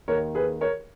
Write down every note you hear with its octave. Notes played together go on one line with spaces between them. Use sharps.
D#2 D#3 A#4 C#5
G#4 B4
A#4 C#5